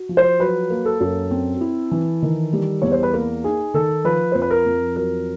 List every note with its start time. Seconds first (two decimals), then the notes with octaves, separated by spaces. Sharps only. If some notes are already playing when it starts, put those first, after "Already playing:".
Already playing: F#4
0.09 F3
0.17 C5
0.39 F#3 B4
0.70 A#3
0.85 A4
1.00 F#2
1.31 C4
1.61 E4
1.92 E3
2.22 D#3
2.53 G3
2.82 E2 C#5
2.92 C5
3.03 B4
3.13 A#3 A#4
3.44 D#4 G#4
3.74 D#3 A4
4.04 F3 B4
4.32 F2 C5
4.42 B4
4.51 A#4
4.66 F2
4.96 F#3 A#4